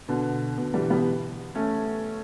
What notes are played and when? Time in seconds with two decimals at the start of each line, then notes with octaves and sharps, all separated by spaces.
0.08 B2 D3
0.57 B2
0.74 E3 G3
0.90 G3 B3
1.55 A3 C#4